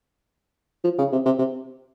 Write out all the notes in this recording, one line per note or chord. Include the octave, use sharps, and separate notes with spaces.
F3
C#3
C3
C3
C3